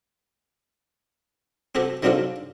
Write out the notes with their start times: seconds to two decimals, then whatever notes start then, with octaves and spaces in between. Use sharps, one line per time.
1.75 C4 F#4 G4 A4
2.03 D#3 F#3 C4 D4 F4 A4